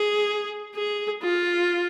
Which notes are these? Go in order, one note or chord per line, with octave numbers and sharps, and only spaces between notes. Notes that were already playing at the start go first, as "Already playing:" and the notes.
Already playing: G#4
G#4
F4